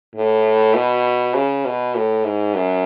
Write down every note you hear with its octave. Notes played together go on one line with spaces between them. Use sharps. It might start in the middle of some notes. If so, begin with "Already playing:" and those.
A2
B2
C#3
B2
A2
G#2
F#2